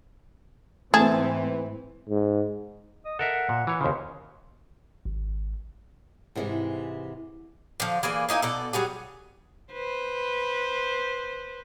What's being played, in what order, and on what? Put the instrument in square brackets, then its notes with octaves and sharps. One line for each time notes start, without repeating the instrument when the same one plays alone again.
[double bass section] G#2 C4 [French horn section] E3 [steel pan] A3 A5 [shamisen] G#4
[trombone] G#2
[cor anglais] D#5
[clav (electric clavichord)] A4 A#4 E5 [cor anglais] F#5
[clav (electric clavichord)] A#2
E3 C#5
[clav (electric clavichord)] D#2 C#3 [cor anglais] C5
[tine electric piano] G#1
[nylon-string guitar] G#2 C3 E3 G3 G#3
[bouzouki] D3 F3
E3 A#3 G#4 D5
A#3 D#4 E4 G#5
B2 A4 D5
F#3 G3 F#4 G#4
[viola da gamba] B4 C5